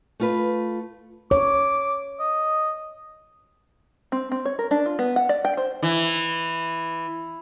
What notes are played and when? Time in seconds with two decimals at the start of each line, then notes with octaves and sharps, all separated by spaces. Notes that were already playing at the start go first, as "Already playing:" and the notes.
0.20 A3 F4 B4
1.31 C#5 D6
2.20 D#5
4.12 C4
4.32 C4
4.45 C#5
4.59 A#4
4.71 D4
4.86 F4
4.99 B3
5.16 F#5
5.29 D5
5.45 G5
5.57 C5
5.83 E3